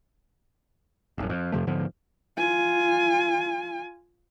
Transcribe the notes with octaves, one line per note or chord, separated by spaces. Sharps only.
D#1 G#1 F#2
F2
F2 C3 F3 A3
G#2 D3 F3 B3
F4 G#5